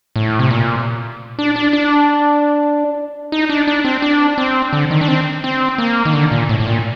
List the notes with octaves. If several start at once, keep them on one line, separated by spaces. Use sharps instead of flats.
A2
C3
A#2
D4
D4
D4
D#4
D4
D4
C4
D4
C4
D3
D#3
D4
C4
C4
A#3
D#3
D3
A#2
A2
A2
A#2